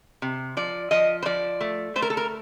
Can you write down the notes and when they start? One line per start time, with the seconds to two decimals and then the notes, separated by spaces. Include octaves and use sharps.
0.22 C3
0.57 F3 D5
0.91 F3 D#5
1.23 C5
1.25 F3 D5
1.61 A3
1.96 A3 C5
2.02 A#4
2.10 A4
2.17 A#4